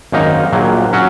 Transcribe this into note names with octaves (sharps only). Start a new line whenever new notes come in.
G#1 F#2 D#3 A#3 D#4
A#1 A#2 F#3
F#3 C#4 F#4